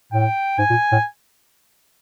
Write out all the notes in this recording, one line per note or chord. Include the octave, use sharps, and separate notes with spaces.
A2 G5
G#2 G#5
A#2
A2